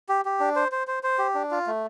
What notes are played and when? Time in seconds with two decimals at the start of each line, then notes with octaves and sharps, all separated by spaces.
0.09 G4
0.25 G4
0.40 D4
0.56 C5
0.72 C5
0.87 C5
1.03 C5
1.18 G4
1.35 D4
1.51 F4
1.67 A3